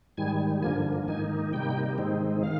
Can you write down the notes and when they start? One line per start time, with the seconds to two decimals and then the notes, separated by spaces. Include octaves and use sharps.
0.17 G#2 D#3 G3 G#5
0.63 G2 D3 F3 A#3 G#5
1.08 G#2 D#3 A#3 D#4 G#5
1.53 C3 G3 A#3 D#4 G5
1.98 G#2 D#3 G#3 C4 D#4
2.43 D#3 F5